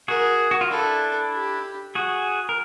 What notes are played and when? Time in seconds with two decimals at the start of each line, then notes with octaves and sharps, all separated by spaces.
0.08 F#4 G#4 A#4
0.51 F#4
0.61 F4
0.71 D4 E4 A4
1.33 G4
1.95 F#4 G#4
2.49 A#4